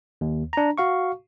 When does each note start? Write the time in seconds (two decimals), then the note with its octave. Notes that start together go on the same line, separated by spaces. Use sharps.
0.21 D#2
0.53 D4 A#5
0.78 F#4 F5 C#6